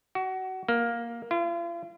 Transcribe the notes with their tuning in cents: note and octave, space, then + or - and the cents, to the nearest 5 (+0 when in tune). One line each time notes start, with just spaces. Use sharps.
F#4 +25
A#3 +5
F4 -40